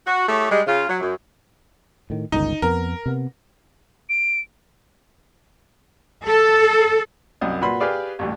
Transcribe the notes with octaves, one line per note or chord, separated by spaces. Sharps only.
F#4
A3 E4 G4 G#4 C#5
G3 G#3
C#3 F4
F#3
F#2
A2 D#3
G1 C#2 D#3 D#4
F2 B3 A#4
C3 B3
D7
A4
C2 F#2 G3 D#5
A#2 F#4 B4 B5 C6
G4 G#4 B4 D5 F5
A1 D2 G2